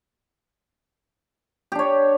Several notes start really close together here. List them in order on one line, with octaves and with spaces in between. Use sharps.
G4 D4 C#5